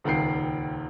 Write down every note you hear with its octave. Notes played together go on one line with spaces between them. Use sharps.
D#1 C#2 D#3 G5 C7